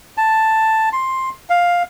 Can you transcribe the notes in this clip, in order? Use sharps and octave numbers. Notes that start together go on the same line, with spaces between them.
A5
C6
F5